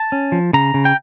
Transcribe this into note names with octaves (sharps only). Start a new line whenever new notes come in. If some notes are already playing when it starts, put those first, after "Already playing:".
Already playing: A5
C#4
F3
C#3 A#5
C#3
G5